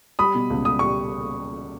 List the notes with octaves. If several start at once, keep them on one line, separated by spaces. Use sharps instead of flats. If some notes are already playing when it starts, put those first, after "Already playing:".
G3 B5 D#6
B2
C#2
C#2 D#6
G3 C#6